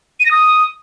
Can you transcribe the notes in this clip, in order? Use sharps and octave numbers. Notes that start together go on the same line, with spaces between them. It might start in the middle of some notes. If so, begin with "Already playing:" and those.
D#7
A#6
D#6